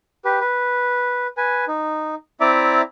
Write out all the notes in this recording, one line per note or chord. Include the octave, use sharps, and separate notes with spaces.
G4 B4
B4
B4 G#5
D#4
C4 E4 D5 E5 A#5 D6